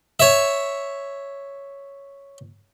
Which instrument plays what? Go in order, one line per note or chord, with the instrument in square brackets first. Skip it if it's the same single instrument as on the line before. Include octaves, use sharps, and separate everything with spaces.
[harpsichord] C#5 E5